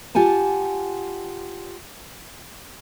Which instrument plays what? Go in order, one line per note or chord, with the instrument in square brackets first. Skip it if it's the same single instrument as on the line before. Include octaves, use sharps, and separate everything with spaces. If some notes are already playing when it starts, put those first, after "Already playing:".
[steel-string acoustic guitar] F4 G4 F#5 G#5 A5